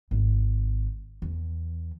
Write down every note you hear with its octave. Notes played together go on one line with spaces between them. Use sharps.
G#1
E2